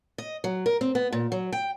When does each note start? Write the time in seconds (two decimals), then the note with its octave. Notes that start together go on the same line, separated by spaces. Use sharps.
0.18 D#5
0.44 F#3
0.66 A#4
0.81 C4
0.95 B3
1.12 A#2
1.32 F#3
1.52 G5